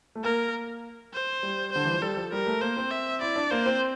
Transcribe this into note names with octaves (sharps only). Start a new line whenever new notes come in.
A3
A#3 A#4
C5
G3
D3 C5
E3
F3
G3 A4
F3
G3 A#4
A3
A#3 C5
C4
E5
E4 D5
D4
A#3 C5
C4